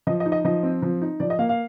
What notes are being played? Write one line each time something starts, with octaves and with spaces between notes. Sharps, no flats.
F3 D#5
D#5
D#4
D#5
F3 D#5
C4
F3
D#4
F3 D5
D#5
A#3 F5
F5